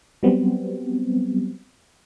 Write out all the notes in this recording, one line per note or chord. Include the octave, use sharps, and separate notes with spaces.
F#3 G3 B3 C4